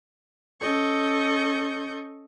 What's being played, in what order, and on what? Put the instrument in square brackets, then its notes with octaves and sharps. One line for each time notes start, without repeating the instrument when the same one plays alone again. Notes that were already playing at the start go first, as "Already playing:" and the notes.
[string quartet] C#4 A4 D#5 C#6 G6